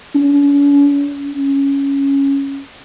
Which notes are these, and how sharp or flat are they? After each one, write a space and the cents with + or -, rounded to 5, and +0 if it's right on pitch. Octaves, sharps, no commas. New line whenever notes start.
C#4 +45
C#4 +0